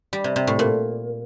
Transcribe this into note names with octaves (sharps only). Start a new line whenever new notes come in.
G3
C3
C3
A2
A#2